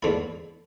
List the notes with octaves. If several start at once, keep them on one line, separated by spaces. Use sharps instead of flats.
E2 D3 A3 E4